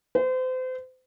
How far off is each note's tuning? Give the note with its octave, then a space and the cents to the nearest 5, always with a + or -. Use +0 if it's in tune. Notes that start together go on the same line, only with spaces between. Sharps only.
C5 -35